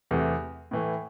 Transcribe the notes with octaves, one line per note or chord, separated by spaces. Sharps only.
E2 C3 E3 A3
A2 E3 A3